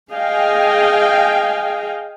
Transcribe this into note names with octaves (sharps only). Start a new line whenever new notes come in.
G#4 D#5 F5 G5 G#5